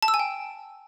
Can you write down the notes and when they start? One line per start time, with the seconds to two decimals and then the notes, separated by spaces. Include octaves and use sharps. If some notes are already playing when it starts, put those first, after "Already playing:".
0.03 A5
0.08 E6
0.14 G#5
0.19 G5